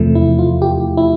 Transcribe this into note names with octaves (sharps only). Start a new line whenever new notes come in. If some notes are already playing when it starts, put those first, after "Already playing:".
Already playing: E2 C3 F3 A3
E4
F4
G4
E4